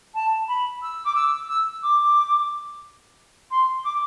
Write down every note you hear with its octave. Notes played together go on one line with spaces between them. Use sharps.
A5
B5
E6
D6
E6
E6
D6
C6
D6